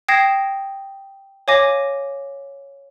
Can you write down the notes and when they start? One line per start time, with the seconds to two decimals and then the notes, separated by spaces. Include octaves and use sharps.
0.08 G5 D#6 G#6 A#6 C7 E7
1.48 C#5 F5 G#5 D6 A#6